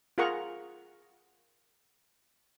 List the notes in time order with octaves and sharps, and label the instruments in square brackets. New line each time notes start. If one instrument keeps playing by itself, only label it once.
[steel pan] F4 G#4 A#4 F#5 A#5 C#6